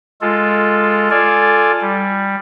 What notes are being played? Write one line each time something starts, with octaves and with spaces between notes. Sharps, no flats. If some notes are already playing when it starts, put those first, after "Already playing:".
G#3 F4 A4
F4 A4 D5 G#5
G3